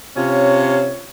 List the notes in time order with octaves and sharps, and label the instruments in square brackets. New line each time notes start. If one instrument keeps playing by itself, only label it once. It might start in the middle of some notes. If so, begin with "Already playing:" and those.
[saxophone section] C3 C#4 F4 C#5